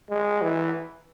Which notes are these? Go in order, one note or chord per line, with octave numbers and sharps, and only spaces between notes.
G#3
E3